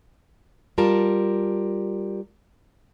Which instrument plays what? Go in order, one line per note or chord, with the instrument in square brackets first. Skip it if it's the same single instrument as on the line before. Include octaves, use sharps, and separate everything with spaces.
[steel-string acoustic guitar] G3 F4 A#4 A5